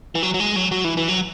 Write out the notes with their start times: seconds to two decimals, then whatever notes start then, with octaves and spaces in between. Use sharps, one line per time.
0.15 E3
0.23 F#3
0.34 F#3
0.40 G#3
0.56 F#3
0.72 F#3
0.84 E3
0.97 E3
1.09 F#3